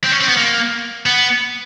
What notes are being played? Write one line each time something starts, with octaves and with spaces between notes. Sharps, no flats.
C4
C#4
C4
B3
A#3
B3